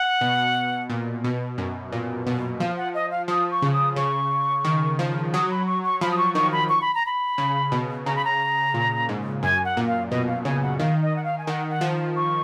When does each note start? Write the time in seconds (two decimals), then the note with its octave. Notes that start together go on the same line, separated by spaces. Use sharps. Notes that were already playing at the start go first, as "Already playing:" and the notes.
Already playing: F#5
0.21 B2
0.90 A#2
1.24 B2
1.58 F#2
1.92 A#2
2.27 B2
2.60 F3 F5
2.77 F#5
2.94 D#5
3.11 F5
3.28 F3 D#6
3.51 C#6
3.62 C#3
3.73 D#6
3.96 C#3 C#6
4.65 D#3
4.99 F3
5.34 F#3 D#6
5.51 B5
5.67 C#6
5.84 C#6
6.01 F3 B5
6.12 D#6
6.18 C#6
6.35 D#3 C#6
6.52 B5
6.69 C#6
6.81 B5
6.95 A#5
7.06 B5
7.38 C#3
7.72 B2
8.06 C#3 A#5
8.16 B5
8.25 A#5
8.74 A#2
9.09 G#2
9.43 F#2 G#5
9.65 F#5
9.77 A#2
9.88 F5
10.10 B2 D#5
10.27 F5
10.45 C#3 G#5
10.62 F#5
10.79 D#3 F5
11.02 D#5
11.16 F#5
11.24 F5
11.38 G#5
11.47 D#3 F#5
11.70 F#5
11.81 F3
12.16 C#6